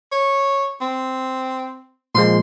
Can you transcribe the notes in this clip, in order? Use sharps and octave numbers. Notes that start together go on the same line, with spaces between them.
C#5
C4
A#2 F3 G#3 C6